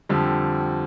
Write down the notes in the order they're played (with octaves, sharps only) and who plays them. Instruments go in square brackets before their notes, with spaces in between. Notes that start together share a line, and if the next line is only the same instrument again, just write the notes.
[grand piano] F2 D3 G3